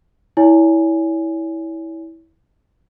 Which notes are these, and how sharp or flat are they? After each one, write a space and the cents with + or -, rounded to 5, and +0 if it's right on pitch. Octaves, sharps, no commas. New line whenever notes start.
E4 -15 C#5 +40 G#5 +0